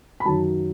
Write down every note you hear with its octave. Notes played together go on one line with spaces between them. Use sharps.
B5
F#2 D#3 F#3 A5